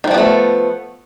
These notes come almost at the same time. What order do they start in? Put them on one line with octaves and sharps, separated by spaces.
D#3 F3 G3 B3 A3